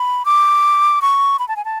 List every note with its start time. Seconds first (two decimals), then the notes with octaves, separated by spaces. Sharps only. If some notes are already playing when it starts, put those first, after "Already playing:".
Already playing: B5
0.25 D6
1.02 C#6
1.39 B5
1.48 A5
1.56 G#5
1.65 A5